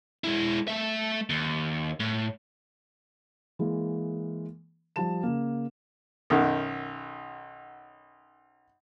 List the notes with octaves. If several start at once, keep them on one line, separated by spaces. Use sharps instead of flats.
G#3 E4
A3 E5
D#2
A2
E3 G#3 A#3
F3 G3 A5 E7
C#3 A#3
B1 F#2 D#3